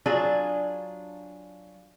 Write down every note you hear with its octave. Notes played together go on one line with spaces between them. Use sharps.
F#3 D4 F4 G#4